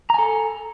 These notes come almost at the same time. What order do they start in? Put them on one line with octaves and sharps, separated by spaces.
A#5 G#5 A4